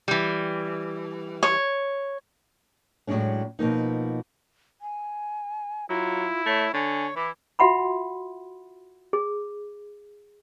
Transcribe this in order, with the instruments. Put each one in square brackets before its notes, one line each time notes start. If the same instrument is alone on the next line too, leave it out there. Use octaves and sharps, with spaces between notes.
[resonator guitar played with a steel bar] E3 G3
[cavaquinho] C#5
[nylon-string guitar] A2 F#3 G#3 C#4 D4
B2 F3 A#3 D#4
[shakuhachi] G#5
[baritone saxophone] F#3 [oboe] E4 [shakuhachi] F4
[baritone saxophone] A3 [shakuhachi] C#5
[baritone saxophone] D3 [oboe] C#5 [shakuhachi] G#5
[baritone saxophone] E3 [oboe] E4 [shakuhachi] D6
[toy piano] F4 F#4 E5 F#5 B5 C6
G#4